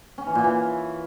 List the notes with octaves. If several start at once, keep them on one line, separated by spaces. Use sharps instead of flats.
C#4
E3
A#2
E3